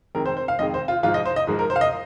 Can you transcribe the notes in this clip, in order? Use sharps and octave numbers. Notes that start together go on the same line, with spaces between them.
F2 D#3 G#3 A#4
C5
C5
F5
F2 D#3 G#3 D#5
C5
F4
G#2 F3 G#3 F4
D#5
C5
D#5
G#2 F3 G#3
A#4
C5
F5
D#5